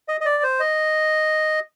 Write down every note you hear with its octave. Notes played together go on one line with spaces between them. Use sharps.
D#5
D#5
D5
C5
D#5